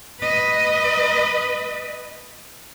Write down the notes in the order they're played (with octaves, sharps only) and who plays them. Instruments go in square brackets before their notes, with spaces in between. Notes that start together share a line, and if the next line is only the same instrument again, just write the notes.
[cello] B4 D#5